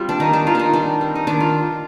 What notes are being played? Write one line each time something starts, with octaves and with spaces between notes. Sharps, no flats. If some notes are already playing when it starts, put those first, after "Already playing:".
Already playing: G3 C4 F4
D4
D#3 D#4
D4
D#3 F4
D4 D#4
G3 D4
C4
D#4
D#3 D4
F4